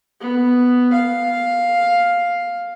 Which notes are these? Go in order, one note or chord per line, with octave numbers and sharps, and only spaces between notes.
B3
F5